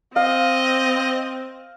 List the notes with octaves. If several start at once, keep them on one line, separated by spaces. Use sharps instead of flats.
C4 D#5 F5